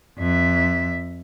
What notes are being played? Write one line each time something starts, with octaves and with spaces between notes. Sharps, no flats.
F2 E5